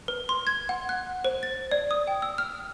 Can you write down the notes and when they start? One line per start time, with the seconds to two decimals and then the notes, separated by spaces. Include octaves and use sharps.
0.08 B4
0.29 C6
0.47 G#6
0.69 F#5
0.89 F#6
1.25 C5
1.43 A6
1.72 D5
1.91 D#6
2.07 G5
2.22 E6
2.38 F6